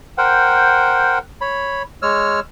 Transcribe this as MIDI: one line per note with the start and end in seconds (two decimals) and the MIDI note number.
0.18 1.19 70
0.18 1.19 72
0.18 1.19 78
0.18 1.19 79
1.41 1.83 73
1.41 1.83 83
2.02 2.40 56
2.02 2.40 73
2.02 2.40 88
2.02 2.40 89